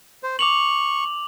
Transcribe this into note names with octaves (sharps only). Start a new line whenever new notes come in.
C5
C#6 D6 F7 F#7